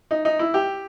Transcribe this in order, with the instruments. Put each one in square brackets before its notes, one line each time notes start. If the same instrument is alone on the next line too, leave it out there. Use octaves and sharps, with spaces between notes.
[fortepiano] D#4
D#4
E4
G4